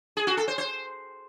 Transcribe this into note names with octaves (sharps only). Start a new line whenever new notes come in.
G#4
F#4
A4
C5
C5